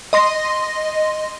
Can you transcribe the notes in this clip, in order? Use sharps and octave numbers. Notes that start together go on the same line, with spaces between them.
D#5 C6 A#6